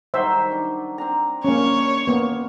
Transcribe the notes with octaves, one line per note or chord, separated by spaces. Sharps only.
D#3 F#3 G3 C5 E5
D4
C4 D4 A#5
A#3 C#4 C#5
A#3 B3